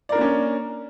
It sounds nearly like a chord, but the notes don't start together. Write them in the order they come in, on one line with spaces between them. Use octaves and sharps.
D5 A#4 D4 A#3 C#4